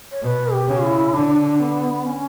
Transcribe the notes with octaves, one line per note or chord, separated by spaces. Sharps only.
C#5
B2 B4 C#5
G4
C#3
E4
D3 D4
B3
C#4